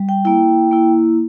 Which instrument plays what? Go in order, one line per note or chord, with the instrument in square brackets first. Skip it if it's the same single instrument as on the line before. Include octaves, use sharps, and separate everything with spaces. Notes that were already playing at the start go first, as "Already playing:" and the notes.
Already playing: [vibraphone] G3
G5
A#3 E4 G5
A#3 E4